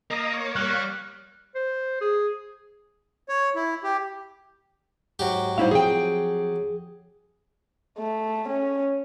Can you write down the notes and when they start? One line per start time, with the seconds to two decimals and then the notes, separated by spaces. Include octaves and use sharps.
0.11 A#3 D#5 A#5
0.34 C#5
0.56 G3 F6 F#6
1.55 C5
2.01 G#4
3.29 C#5
3.55 E4
3.83 G4
5.19 G#2 F#3 G4
5.58 A2 G3 D#4 E4 C5 F5
5.71 F3 C4 G#4 G5
7.98 A3
8.48 C#4